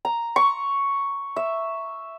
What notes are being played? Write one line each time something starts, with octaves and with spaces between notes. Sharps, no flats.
A#5
C#6
E5